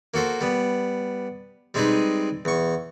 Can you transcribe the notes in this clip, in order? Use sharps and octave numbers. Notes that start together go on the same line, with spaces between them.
A#3 F#4 A4 C5
G3 B3
G3 G#3 C4 D#4 G#4 B4
E2 C#6